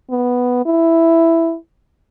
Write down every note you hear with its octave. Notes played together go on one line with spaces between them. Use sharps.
B3
E4